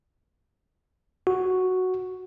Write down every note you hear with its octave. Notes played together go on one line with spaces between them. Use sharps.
F#4